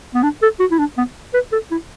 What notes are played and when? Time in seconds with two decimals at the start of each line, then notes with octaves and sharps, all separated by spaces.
0.14 B3
0.23 D4
0.42 A4
0.60 F#4
0.71 E4
0.79 D4
0.97 B3
1.34 B4
1.52 A4
1.71 E4